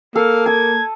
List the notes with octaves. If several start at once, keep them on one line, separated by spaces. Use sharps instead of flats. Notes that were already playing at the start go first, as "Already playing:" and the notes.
A#3 A4 F5
A5 D#6 G#6